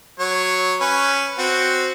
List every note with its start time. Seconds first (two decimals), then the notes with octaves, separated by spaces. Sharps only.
0.19 F#3 C#5
0.81 C#4 B4
1.39 C4 F#4